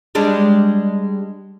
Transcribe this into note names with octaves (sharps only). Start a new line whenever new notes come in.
G3 G#3 D4